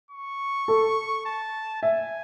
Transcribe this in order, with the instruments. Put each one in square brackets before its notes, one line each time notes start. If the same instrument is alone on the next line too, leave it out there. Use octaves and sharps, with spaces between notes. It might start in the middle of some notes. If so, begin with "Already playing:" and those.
[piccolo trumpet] C#6
[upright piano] A4
[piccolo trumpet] A5
[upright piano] E5 [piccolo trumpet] G#5